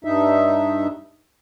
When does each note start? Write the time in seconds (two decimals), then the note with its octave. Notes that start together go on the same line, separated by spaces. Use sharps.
0.05 G2 D#4 E5